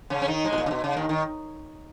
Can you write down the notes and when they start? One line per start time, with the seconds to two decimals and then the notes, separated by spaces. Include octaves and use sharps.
0.10 C#3 C#4
0.22 C#4
0.28 D#3 D#4
0.44 G#2 G#3
0.53 B2
0.58 A#2
0.66 C#3
0.71 B2
0.84 C#3
0.96 D#2 D#3
1.09 D#3